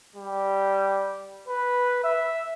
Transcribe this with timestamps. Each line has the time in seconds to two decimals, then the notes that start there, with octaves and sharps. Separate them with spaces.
0.16 G3
1.48 B4
2.04 E5